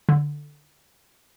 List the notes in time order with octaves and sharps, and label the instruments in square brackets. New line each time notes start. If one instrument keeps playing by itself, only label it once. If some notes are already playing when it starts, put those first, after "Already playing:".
[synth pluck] D3